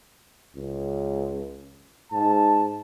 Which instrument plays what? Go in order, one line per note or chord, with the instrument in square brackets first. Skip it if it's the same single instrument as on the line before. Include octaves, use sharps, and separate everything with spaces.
[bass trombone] C#2
[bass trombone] G#2 [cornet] A5